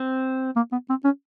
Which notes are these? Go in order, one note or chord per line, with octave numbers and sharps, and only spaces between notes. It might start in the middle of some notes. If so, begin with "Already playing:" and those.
Already playing: C4
A#3
B3
C4
C#4